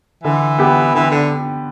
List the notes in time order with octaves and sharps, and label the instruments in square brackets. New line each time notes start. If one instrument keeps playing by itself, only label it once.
[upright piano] D3 [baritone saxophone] E3
[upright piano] B3 G4
[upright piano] D3 [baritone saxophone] E3
[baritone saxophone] D3